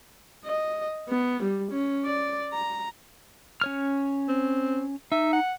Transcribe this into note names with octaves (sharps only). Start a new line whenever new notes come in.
D#5
B3
G3
C#4
D5
A#5
C#4 C#5 F6
C4
D#4 E5
F#5